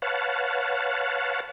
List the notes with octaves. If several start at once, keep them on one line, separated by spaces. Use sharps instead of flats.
B4 C#5 F5 F#5 A5